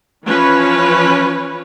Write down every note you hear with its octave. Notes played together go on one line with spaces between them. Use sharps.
E3 F3 C#4 B4 C#5